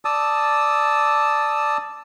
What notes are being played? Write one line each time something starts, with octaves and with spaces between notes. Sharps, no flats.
D5 A5 D#6 E6